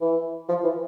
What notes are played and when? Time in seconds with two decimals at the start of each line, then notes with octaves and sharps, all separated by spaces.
0.01 E3
0.49 F3
0.64 E3